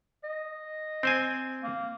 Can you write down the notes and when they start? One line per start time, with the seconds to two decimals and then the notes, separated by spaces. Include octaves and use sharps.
0.24 D#5
1.03 C4 C5 G#5
1.63 A#3